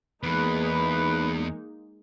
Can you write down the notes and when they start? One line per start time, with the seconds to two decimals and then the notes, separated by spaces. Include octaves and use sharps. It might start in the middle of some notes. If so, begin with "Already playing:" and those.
0.23 E2 G#3 A#3 D#4 B4